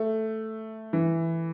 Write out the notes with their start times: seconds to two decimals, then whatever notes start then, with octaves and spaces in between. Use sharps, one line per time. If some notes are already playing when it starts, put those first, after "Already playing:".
Already playing: A3
0.93 E3